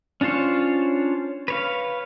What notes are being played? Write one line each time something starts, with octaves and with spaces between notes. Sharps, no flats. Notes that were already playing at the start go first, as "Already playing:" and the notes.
C#4 D4 F4 C5 C#5
B4 C#5 F5